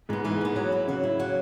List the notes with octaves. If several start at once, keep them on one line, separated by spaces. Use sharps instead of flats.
G#2 G#3 B3
G#2 E3
G#3 B3
F#3
E4
C#3 F#3
E4
F#3